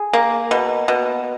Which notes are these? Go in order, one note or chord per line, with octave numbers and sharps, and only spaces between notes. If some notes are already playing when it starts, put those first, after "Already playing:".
Already playing: G#4
A#3
B2
B2